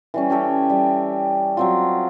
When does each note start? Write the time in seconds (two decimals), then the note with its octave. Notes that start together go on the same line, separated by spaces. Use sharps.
0.14 E3 G3 C#4
0.30 C#4 G4 A4 E5
0.70 G3
1.57 F#3 C4 F4